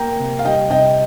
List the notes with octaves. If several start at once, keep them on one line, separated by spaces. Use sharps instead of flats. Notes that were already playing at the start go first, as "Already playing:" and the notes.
Already playing: A#3 G5 A#5
C3
F5
G3 D#5 G5
C3 D#5 G5